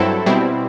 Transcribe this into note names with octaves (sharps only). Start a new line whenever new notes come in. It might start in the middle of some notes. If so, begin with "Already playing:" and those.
Already playing: G2 F#3 C4 E4 A4
B2 G3 C4 E4